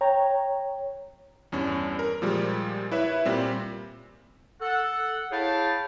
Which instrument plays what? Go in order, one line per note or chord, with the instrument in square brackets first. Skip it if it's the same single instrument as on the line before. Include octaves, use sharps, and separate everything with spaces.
[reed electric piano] C#5 G5 A#5
[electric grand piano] E2 G2 C#4
A#4
A#2 F3 G3 G#3
E4 B4 C#5 E5
A#2 G3 C4
[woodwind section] A4 F#5
E4 G#4 C#5 F5 G5 A5